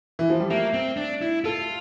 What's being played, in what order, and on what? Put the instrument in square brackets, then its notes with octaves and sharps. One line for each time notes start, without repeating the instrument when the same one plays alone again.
[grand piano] E3
F3
G3
[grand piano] A3 [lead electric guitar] A#3
[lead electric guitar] C4
D4
E4
[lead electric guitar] F4 [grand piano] A4